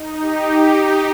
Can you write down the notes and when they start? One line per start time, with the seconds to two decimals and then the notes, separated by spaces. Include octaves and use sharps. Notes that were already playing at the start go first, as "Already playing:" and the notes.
Already playing: D#4
0.21 G4